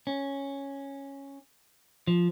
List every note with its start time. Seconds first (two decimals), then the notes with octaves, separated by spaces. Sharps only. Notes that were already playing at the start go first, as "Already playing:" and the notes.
0.07 C#4
2.07 F3